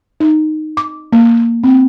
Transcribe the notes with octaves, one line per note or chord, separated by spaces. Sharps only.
D#4
D6
A#3
C4